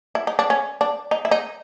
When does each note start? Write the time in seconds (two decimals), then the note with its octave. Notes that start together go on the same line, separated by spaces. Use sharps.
0.15 E4
0.27 D#4
0.39 D4
0.50 C#4
0.81 D4
1.11 D#4
1.25 E4
1.31 D#4